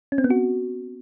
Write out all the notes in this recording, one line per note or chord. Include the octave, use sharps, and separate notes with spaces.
C#4
C4
B3
F#4